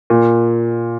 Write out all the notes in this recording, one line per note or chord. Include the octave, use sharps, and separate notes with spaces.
A#2